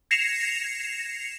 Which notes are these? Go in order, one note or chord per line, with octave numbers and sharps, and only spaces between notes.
G#6 A#6 C7 C#7 E7 F7